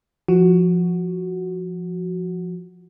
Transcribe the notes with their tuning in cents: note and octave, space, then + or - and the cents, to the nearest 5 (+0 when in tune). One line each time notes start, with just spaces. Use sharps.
F3 +0 F#4 +0